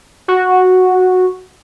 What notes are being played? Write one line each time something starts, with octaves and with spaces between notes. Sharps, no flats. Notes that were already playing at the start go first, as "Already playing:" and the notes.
F#4